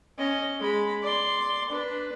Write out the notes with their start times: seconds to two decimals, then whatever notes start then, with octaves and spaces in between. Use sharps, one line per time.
0.18 C#4 D#5
0.59 G#3 B5
1.02 D5 C6
1.70 D4 B4